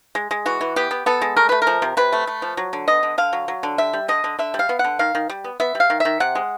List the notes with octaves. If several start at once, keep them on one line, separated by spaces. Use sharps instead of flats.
G#3
G#3
E3 F#4
E3
B3 G4
B3
B3 A4
G#3
A3 A#4
A3 B4
A#4
F3
C3
C3 B4
A3
A3
F3
F#3
D3
B3 D#5
D3
D3 F5
F#3
F#3
D3
G3 E5
G3
D3 D#5
D3
D3 E5
G3
F5
B3
F#5
D3
D#3 F5
D#3
G3
B3
B3 E5
G3
F5
D#3
D#3 E5
C3 F#5
G#3